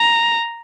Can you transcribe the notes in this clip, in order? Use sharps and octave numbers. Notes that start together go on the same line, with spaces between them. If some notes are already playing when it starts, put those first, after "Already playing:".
Already playing: A#5